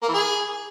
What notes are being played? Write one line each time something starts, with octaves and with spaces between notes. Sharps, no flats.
A#3
E3
G#4